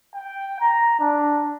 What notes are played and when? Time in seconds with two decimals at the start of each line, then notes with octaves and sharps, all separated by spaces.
0.15 G5
0.60 A#5
1.00 D4